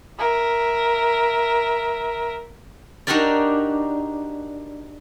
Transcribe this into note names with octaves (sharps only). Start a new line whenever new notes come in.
A#4 E5
D4 D#4 F#4 G4 A#4 D5